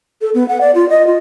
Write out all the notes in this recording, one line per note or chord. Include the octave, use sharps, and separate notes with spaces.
A4
B3
F#5
D5
F4
D#5
F4